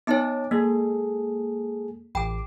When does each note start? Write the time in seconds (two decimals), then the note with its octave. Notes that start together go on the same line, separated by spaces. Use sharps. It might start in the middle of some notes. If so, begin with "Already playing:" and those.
0.07 B3 D#4 C#5 D#5 A5 D6
0.51 G#3 A#3 G#4 A4
2.15 A1 G5 B5 D6